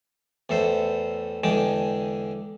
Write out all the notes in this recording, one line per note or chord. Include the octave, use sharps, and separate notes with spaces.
E2 A2 A4 C5
E2 D3 G#3 G5 A5